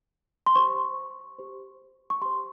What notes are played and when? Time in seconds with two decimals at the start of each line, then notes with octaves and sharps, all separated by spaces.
0.46 C6
0.55 G4 C5 C#6
1.38 G4 C5
2.10 C#6
2.21 G4 C6
2.25 C5